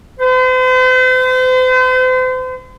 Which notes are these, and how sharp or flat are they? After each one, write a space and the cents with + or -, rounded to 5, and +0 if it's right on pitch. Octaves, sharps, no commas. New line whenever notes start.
C5 -40